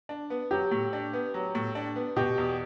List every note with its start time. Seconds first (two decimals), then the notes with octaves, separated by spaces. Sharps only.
0.09 D4
0.30 B3
0.51 F#3 G4
0.71 A2
0.93 D4
1.13 B3
1.34 F#3
1.55 A2
1.75 D4
1.96 B3
2.16 B2 G4
2.38 E2